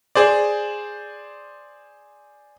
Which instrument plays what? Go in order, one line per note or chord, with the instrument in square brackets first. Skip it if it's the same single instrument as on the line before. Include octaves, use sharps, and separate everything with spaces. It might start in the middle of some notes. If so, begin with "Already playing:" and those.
[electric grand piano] G#4 C5 D5